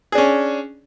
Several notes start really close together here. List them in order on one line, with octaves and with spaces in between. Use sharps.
G#4 D4 C#4